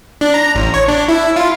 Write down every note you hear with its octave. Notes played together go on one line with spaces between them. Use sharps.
D4
A#5
A1
C#5
D4
E4
F4